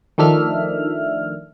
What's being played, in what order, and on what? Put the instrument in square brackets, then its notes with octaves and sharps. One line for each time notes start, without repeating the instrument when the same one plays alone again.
[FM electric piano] D#3 F3 A3 D4 E5 F6